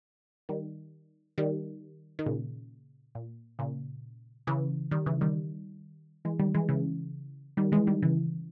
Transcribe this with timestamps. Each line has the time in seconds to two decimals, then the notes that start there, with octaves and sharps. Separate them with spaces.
0.49 D#3 G3
1.38 D#3 G3
2.19 D#3
2.26 A#2 C#3
3.15 A#2
3.59 A#2 C#3
4.47 C#3 E3
4.91 D#3 G3
5.06 C#3 E3
5.21 D#3 G3
6.25 E3 G#3
6.39 D#3 G3
6.55 E3 G#3
6.69 C#3 E3
7.57 D#3 G3
7.72 E3 G#3
7.87 D#3 G3
8.03 C#3 E3